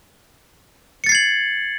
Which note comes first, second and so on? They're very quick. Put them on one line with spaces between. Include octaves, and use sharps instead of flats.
C#7 A6 C7 G#6 F#7